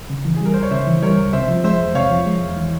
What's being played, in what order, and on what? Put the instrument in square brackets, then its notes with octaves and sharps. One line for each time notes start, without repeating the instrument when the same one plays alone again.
[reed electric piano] C#3
E3
[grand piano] G#4
[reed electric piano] G3 [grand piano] A#4
[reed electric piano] C#2 [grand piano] C5
[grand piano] C#5
[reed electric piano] C#3 [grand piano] C5 E5
[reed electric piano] E3
[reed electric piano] G3 [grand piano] A#4 C#5
[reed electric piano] C#2
[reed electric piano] C3 [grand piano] C5 E5
[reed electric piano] F3
[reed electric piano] G#3 [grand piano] C5 E5
[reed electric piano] E2
[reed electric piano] C3 [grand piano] C#5 F5
[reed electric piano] F3
G#3
E2
E3